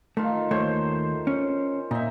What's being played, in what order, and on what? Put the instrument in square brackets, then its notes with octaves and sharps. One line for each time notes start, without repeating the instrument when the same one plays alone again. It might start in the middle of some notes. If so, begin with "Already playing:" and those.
[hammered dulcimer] D#3 F4 [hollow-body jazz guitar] A3
[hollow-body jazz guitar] D#2 A3 C#5 [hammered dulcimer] C5
[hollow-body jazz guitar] C#4
[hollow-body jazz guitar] A#2 [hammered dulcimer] D#4 E5